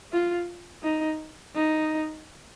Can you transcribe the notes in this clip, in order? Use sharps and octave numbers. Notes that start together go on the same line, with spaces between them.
F4
D#4
D#4